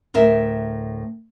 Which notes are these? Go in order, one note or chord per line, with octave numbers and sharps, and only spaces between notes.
D2 A2 A#4 E5